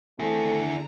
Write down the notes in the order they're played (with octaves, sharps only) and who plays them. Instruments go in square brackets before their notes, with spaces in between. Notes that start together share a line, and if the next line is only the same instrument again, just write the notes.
[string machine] D3 D4 A#5 [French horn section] A3 C4 A4 [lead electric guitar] E4 G#4